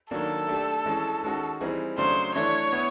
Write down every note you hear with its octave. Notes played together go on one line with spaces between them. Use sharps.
D#3 F#3 A#3 D4 A4
A3 D4 G4
E3 G#3 C#4
D#3 G#3 C#4 F#4
E3 G3 C4 D#4 G#4
C#3 F#3 A3 D4 C5
E3 A3 D4 C#5
B3 E4